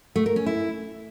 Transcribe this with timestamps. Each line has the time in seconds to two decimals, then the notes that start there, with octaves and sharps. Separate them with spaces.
0.16 A3
0.26 A#4
0.36 C#4
0.46 E4